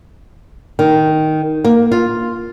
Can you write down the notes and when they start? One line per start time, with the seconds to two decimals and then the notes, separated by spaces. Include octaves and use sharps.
0.79 D#3
1.65 A#3
1.92 F4